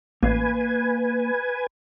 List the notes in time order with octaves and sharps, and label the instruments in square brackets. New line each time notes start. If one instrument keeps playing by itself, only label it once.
[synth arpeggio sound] A1 [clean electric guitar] A#3 F5 [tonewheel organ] B4 G#5